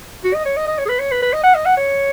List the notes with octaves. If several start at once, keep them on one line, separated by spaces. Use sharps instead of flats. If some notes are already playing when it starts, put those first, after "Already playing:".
F#4
D#5
C#5
D#5
D#5
C#5
G#4
B4
C#5
B4
B4
D#5
F#5
D#5
F#5
C#5